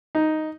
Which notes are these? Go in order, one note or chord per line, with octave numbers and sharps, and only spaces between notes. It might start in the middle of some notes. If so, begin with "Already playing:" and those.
D#4